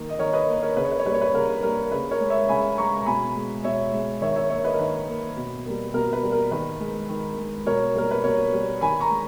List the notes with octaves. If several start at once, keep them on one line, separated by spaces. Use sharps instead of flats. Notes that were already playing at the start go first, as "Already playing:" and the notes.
Already playing: D#3 A#3
D#5
D#3 A#4 C#5
B4 D#5
A#3
A#4 C#5
C#3 B4
C#5
B4
C#5
G3 A#3 B4
C#5
B4
C#3 A#4
G3 A#3 A#4
C#3 B4
A#4 C#5
G#3
C#5 E5
C#3 G#5 B5
G#3 A#5 C#6
A#5
B2 G#5 B5
G#3
B2 C#5 E5
G#3
D#3 C#5 E5
C#5 E5
A#3 C#5 E5
B4 D#5
A#4
D#3 B4
A#3
B2
G3 A#3
B2 A#4
B4
G3 A#3
A#4
D#3 B4
G#3
D#3
G#3
B2 A#4 C#5
G3 A#3 A#4
B4
B2 A#4 C#5
G3 A#3
D#3 G#5 B5
A#5 C#6
G#3